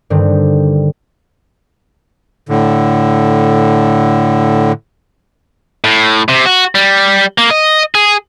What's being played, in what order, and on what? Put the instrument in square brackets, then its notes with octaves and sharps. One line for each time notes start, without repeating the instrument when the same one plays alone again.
[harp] G2 D3 D#3 C4
[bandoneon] A2 D3
[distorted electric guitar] A2
C3
F#4
G3
A#3
D#5
G#4